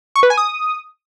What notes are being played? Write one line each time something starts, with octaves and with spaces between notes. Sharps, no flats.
C#6
B4
G#5
D#6